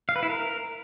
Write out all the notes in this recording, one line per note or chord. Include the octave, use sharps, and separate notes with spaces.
F5
B4
E4
A#4